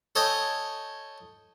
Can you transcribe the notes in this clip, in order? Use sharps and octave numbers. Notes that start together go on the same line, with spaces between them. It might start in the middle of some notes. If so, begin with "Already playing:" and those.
A4 C#5 D#5 G5 G#5